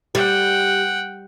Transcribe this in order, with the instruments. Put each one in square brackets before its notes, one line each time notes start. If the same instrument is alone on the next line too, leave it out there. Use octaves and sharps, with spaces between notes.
[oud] G3 [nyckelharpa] F#5 G5